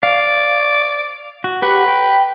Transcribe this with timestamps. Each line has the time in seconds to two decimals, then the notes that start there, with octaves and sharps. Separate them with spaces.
0.03 D5 F5
1.44 F#4
1.62 G4 B4 F#5 C#6
1.88 G5